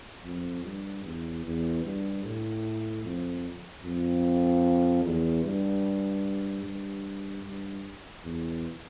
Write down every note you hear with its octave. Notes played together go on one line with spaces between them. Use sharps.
F2
G2
E2
E2
G2
A2
F2
F2
E2
G2
G2
G2
E2